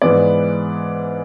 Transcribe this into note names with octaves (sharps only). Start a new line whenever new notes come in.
G#2 E3 G#3 B3 D5